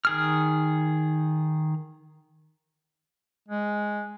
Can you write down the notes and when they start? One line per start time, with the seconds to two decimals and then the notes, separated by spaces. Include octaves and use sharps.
0.05 D#3 G#4 F6
3.48 G#3